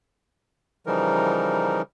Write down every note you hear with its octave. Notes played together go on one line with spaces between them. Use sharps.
C#3 E3 F3 G3 D#4 A#4